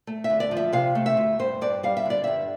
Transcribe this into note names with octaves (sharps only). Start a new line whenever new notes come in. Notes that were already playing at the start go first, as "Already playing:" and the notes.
A3
E5
D2
D5
F3
E5
C3 F5
A3
E5
D2
G2 C5
G2 D5
G3 F5
E5
D3 D5
G2 E5